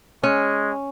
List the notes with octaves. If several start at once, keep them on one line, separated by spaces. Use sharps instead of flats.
G#3 C#4